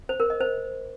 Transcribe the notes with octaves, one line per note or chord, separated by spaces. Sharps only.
C5
A#4
D#5
C5